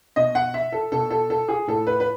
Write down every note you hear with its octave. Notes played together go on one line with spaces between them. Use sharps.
B2 D#5
F#5
E5
A4
B2 A4
A4
A4
G#4
A2 A4
B4
B4